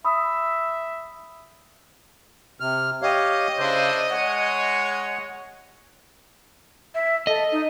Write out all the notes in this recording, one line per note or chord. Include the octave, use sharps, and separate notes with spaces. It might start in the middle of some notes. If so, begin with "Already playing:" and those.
E5 B5 D#6 E6
C3 F6
G4 C#5 D#5 F5
C#3 D4 E4 C5
G#3 C#5 F#5
E5
A4 D#5
D#4